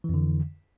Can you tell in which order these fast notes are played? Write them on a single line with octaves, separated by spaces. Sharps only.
E3 F2 D3